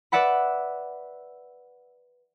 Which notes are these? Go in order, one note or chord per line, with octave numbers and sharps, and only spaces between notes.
B4 D5 E5 F#5 B5